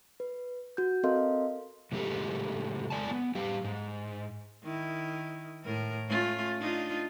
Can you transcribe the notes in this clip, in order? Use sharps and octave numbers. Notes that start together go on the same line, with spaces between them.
B4
F#4 G6
C4 A4 A#4 D#5 F5 C6
A2 C#3 G#3 D#4 G4 A4
G#3 D5 G#5 A5
B3
G3 G4 F5
G#2
D#3 E4
A2 A#4
A3 C#4 F4
D4 D#4 F4